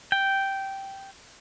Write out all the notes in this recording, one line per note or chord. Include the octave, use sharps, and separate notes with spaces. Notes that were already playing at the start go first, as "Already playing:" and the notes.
G5